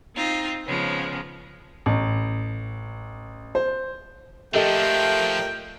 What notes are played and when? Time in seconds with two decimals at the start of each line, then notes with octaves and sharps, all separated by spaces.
0.14 C4 D#4 F4
0.65 C#3 F3 G#3 B3
1.86 A1
3.55 C5
4.54 F3 A3 D4 G4 A4 A#4 D#5 G5